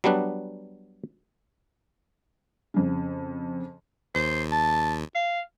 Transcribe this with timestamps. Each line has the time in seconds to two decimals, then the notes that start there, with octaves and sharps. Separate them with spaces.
0.04 F#3 G3 B3 D4 B4
2.74 F2 C#3
4.15 D#2 C5
4.52 A5
5.15 F5